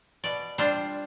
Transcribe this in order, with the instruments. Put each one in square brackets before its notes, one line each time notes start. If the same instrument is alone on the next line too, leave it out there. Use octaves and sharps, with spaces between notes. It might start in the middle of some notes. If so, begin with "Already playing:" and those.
[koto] B2 D5
G3 D4 F4 C5